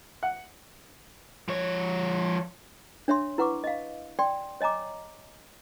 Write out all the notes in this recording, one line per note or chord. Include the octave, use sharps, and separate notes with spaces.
F#5
F3 C#5
D4 C#5 E5 C6
E4 B4 F#5 C#6 D6
D#5 F5
D5 G5 C6
C#5 D#5 G#5 A#5 D6